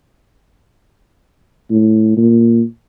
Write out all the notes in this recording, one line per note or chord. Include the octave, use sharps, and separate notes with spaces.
A2
A#2